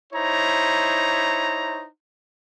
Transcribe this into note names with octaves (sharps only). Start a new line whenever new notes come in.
D#4 E4 C5 C#5 A#5